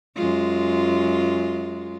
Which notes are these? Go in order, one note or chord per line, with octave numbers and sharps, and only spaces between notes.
F#2 G#3 F4